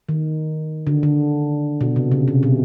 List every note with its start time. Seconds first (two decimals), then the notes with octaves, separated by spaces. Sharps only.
0.09 D#3
0.87 D3
1.03 D3
1.81 B2
1.96 C3
2.12 C#3
2.28 C3
2.43 B2